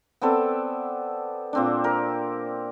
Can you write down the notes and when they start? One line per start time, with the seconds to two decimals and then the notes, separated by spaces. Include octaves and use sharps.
0.21 B3 C4 A4 D5
1.53 A#2 C4 D4
1.84 A#4